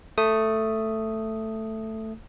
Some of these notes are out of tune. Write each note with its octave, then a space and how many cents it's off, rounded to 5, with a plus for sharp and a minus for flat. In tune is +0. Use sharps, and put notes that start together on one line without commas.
A3 +5 D#6 +0